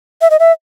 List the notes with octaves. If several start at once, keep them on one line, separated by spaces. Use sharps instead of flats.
E5
D#5
E5